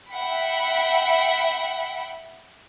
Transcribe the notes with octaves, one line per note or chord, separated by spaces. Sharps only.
E5 F#5 G5 B5